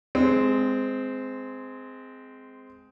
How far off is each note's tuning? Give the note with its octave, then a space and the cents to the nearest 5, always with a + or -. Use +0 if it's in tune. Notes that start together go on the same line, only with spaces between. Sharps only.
G#3 +10 C4 -15